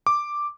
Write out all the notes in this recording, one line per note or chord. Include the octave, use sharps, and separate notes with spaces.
D6